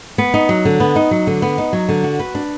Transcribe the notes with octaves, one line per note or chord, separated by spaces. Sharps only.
B3
D#4
F#3
D3
B3
D#4
F#3
D3
B3
D#4
F#3
D3
F#4
B4
D4